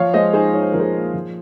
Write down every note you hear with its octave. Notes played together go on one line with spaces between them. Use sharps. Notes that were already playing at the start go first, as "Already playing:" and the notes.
Already playing: F3 C#5 F5
G#3 C5 D#5
D#4 G#4 C5
D#4 C#5
C5
F3 A#4
G#4 C5
A#2
F3